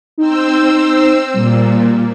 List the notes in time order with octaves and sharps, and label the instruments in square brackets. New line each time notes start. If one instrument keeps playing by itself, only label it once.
[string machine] C4 C5 E6 [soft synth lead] D#4
[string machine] A#2 [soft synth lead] G3